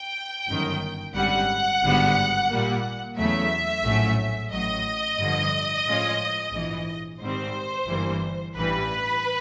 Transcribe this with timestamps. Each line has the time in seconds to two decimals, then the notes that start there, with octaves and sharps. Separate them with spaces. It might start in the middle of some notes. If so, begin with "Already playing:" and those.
Already playing: G5
0.48 G1 F#2 D#3
1.15 G#1 F#2 D3 G3 F#5
1.83 G#1 G2 D3 G3 B3
2.49 A#2 G3 A#3
3.17 E2 C#3 F#3 A3 E5
3.84 A#1 A2 F#3 A3 C#4
4.52 A1 A2 F#3 D#5
5.19 G2 D3 F3
5.87 A2 F3 G#3 C#4 F4
6.53 A#1 G#2 E3
7.21 G#2 D#3 G3 C4 C5
7.88 G1 G2 E3 G3 A#3
8.56 A1 G2 E3 G3 B4